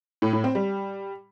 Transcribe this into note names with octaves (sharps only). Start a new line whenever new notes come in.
A2
A2
C4
G3